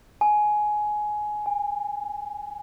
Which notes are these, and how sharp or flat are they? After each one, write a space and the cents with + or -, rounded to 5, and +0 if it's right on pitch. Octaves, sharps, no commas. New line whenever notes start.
G#5 +15
G#5 -35